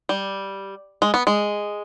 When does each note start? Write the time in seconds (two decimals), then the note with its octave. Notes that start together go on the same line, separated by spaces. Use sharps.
0.09 G3
1.02 G#3
1.14 B3
1.27 G#3